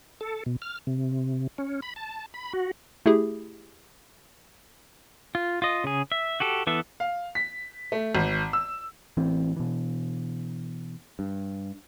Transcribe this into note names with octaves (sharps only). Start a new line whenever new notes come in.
A4
B2
F6
C3
C#4
B5
A5
B5
F#4
A3 E4 G4 G#4
F4
F4 D#5
C#3 G#4
E5
F#4 G4 A4
E3 B3 A4 E5
F5
B6
A3
G#1
E6
A1 E3 C4
B2 E3
G2